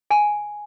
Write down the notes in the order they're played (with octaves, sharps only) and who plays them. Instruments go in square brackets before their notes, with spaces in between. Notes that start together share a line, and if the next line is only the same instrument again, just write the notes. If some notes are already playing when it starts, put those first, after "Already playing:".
[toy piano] G#5